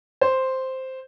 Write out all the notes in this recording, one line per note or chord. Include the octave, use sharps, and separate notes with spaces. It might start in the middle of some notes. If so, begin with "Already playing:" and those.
C5